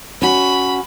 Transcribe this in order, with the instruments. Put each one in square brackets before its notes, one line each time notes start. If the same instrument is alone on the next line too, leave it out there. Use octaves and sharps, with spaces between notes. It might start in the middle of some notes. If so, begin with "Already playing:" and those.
[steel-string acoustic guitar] C#4 F#4 [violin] B5